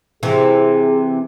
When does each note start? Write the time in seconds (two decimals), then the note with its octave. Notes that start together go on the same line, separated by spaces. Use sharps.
0.23 C3 E3 G#4